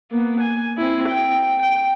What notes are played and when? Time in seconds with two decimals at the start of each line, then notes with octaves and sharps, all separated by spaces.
0.11 A#3 B3
0.40 G#5
0.78 C4 E4
1.09 G5
1.62 G5